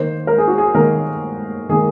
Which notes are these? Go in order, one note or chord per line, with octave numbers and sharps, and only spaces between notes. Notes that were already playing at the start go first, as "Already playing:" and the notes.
Already playing: D#3 A#3 C5
A#4
G#4
F#4
G#4
D#3 A#3 A#4
D#3 A#3 G#4